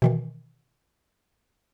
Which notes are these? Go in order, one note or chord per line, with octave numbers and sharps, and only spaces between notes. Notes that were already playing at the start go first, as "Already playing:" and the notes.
B2 D#3 E3